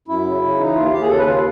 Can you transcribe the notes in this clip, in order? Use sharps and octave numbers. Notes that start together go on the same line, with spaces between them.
F#2 E4
C#3
C#3
E3 D#4
D#2 F4
D#2 G4
G#4
C#3 A4
B4
D#2 F4